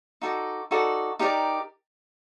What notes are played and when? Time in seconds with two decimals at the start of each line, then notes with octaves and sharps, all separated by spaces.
0.22 D#4 F#4 A4 D5
0.71 D#4 F#4 A4 D5
1.19 D#4 G4 A#4 D5